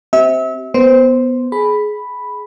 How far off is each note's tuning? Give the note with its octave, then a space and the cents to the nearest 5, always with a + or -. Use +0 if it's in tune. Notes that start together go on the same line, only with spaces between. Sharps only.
C4 +0 G4 -35 E5 -30
B3 +0 C5 +0
G#4 +20 B5 +0